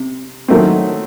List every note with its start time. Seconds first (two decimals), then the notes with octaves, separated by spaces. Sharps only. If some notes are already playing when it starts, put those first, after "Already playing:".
Already playing: C3
0.48 D#3 F#3 A3 C4